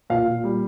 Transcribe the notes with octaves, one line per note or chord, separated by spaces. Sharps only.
A#2 F5
A#2
G3